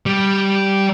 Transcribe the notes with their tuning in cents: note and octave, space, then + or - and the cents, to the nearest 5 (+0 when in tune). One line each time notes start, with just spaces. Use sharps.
G3 -5